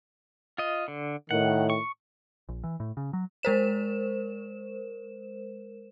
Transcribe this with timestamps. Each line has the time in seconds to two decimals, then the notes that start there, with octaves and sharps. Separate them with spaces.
0.58 F4 D#5
0.88 D3
1.31 A2 D#3 F#5
1.70 C#6
2.49 A#1
2.64 E3
2.80 A2
2.97 C#3
3.13 F#3
3.43 G#3 A#4 C5 E7